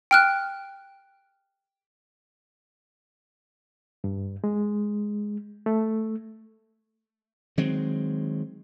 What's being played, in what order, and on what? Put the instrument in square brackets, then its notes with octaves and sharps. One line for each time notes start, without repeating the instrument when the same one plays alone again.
[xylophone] G5 F6 F#6
[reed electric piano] G2
G#3
A3
[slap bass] D#3 F#3 G#3 C4